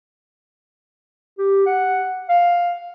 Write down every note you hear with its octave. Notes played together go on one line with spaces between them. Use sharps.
G4
F#5
F5